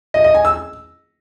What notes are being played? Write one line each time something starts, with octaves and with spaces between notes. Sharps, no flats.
D#5
D#5
G#5
E6